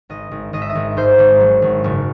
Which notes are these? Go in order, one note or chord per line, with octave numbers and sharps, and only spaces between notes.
G#1 D#5
G#1
G#1 D#5
E5
D#5
G#1
G#2 C5
G#1
F#3
G#1
F#1